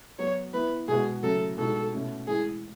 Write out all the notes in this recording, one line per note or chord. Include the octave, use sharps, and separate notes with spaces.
F#3 B3 F#4 C#5
E3 B3 E4 B4
B2 G#3 B3 F#4 G#4
C#3 F#3 A3 A4
B2 G#3 D#4 A4
B2 A3 C#4
A2 E3 G#3 G#4